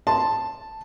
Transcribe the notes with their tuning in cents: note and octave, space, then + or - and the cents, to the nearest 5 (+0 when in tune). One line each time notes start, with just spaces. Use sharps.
A5 +0 C6 +0